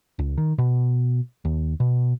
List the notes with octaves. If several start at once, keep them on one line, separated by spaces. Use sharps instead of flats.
C#2
D#3
B2
D#2
B2